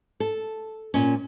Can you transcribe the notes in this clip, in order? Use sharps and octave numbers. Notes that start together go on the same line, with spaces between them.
A4
A#2 C#4